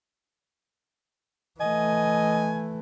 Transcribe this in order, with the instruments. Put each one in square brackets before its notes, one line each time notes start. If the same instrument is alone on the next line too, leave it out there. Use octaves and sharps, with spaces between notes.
[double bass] E3 A3 [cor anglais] D#5 [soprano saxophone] G#5